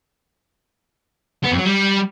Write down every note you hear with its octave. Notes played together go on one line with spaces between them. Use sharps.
B3
F2
F#3
G3